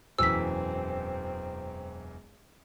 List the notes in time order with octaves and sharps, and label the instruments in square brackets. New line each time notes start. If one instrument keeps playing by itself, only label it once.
[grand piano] E1 F#2 E3 [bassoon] C4 [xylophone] E6 B6